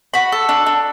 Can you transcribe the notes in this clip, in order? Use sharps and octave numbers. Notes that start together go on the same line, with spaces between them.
F#4 B5
A4
D4
D4